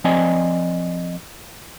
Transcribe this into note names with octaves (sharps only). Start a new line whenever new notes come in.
F3 C4 D5 D#5 G#5